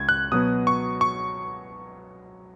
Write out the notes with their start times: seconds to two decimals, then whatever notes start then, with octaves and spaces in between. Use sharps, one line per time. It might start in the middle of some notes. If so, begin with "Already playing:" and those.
Already playing: C#2 G#6
0.09 F#6
0.32 B2 F#3 B3 D#6
0.67 C#6
1.01 C#6